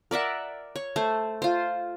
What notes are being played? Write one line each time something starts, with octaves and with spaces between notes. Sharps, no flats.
A#4 D5 E5 F#5
C#5
A3 C5
F4 C5